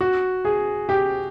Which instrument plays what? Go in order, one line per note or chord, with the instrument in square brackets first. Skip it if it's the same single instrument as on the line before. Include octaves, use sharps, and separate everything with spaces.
[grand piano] F#4
G#4
G4